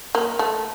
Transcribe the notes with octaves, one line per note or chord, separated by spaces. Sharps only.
A#3
A3